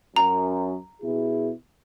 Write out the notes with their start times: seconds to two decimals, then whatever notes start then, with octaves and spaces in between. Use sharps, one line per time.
0.16 F#2 A#5
1.02 B2 E4 G#4